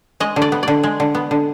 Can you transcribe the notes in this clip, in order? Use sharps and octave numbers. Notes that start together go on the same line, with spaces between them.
G#3 D#5
D3
D5
B3
D3 D5
G#3
D3
B3
D3